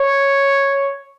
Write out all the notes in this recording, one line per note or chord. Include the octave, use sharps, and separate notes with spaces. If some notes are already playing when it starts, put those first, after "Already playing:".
Already playing: C#5